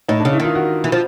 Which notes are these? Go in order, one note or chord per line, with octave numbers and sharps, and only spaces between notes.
A2 D#4
D4
C#3
E4
D#3 F4
F#4
E3
F3